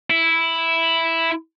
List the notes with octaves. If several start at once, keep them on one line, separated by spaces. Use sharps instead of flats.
E4